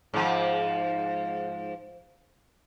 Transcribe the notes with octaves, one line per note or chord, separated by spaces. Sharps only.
G#2 F3